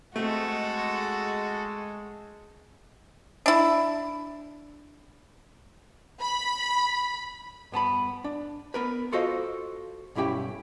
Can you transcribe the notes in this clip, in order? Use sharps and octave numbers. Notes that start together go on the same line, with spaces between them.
G#3 A3 C4 F#4 A4
D4 E4
B5
G2 B3 A5 B5
D4
B3 A#4 B4
F4 F#4 A4 C5 D#5 F5
B1 G2 C#4 E4 G4 G5